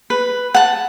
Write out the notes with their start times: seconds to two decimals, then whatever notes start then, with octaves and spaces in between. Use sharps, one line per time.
0.10 B4
0.54 F#5 A5